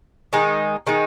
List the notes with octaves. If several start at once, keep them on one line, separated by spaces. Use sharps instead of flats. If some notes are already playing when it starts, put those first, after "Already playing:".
D#3 G#3 D#4
D#3 G#3 D#4